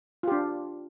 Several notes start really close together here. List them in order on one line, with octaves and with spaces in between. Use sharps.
F4 G4 D4